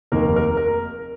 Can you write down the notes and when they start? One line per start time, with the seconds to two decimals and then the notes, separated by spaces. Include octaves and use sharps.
0.12 F1 D#2 D#3 A#3 A#4
0.36 A#4
0.57 A#4